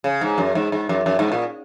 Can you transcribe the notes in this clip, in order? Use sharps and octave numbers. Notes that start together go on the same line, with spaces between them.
C#3
G#2
F#2
G#2
G#2
F#2
F#2
G#2
A#2